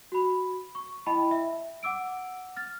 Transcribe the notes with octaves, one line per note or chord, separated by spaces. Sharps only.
F#4 B5
C#6
E4 D#5 G5 A5 B5
E5
F#5 D6 E6 D7
F6 A6